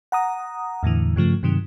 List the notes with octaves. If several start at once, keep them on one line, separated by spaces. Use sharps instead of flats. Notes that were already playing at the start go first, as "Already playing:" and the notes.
F#5 A#5 D#6
E2 A2 D3 E3
G2 C#3 F3 A3
G2 C3 D#3 F#3